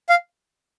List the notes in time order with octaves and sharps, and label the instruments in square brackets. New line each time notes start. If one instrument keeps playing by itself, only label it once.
[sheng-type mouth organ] F5